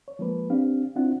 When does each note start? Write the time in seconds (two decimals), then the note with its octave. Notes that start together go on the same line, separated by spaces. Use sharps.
0.08 C#5
0.19 F3 G#3 A#3 B4
0.50 C4 D4 G4 F5
0.96 C4 D4 E4 F4 F#5